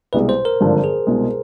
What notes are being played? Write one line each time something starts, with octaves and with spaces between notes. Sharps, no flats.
C2 B2 G#3 B4
C5
A#4
G#1 G2 D3 F3
G#4
C2 B2 G#3